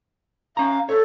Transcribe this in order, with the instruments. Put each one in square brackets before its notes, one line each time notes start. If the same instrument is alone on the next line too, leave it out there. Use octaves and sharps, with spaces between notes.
[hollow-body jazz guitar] C#4 A#5 [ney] F5
[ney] A4 [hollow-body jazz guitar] C#5